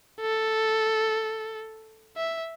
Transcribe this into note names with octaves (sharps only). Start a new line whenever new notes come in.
A4
E5